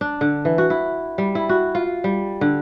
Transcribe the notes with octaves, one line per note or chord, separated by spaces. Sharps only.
D4
D3
E3
F#4
E4
G3
E4
F#4
F4
G3
D3